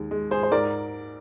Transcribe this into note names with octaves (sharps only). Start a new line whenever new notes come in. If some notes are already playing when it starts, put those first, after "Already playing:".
Already playing: D#2 G#3
G#3
G#3 G#4 C5
C5
G#2 A#4 D5